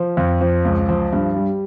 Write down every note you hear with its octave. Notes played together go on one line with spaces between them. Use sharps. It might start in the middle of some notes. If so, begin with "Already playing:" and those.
Already playing: F3
F2
F3
C#2
F3
G2
G3